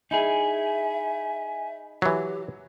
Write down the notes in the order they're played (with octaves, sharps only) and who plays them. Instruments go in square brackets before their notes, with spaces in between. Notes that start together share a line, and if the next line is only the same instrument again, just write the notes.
[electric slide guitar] D#4 E4 G#4 [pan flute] E5 [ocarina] G#5
[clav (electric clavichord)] E3 F#3 [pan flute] G4